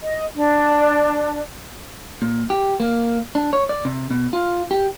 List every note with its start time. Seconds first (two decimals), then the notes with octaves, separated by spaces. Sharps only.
0.02 D#5
0.35 D4
2.22 A#2
2.50 G4
2.80 A#3
3.35 D4
3.53 C#5
3.69 D5
3.85 C3
4.11 B2
4.33 F4
4.71 G4